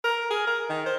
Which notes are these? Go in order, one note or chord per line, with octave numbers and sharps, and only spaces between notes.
A#4
G#4
A#4
D#3
C5